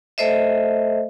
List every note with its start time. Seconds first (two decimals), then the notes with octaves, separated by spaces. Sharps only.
0.18 A3 A4 C5 D#5 E5